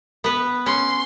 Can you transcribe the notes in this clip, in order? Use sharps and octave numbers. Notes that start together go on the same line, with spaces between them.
B3 B4
C#4 C6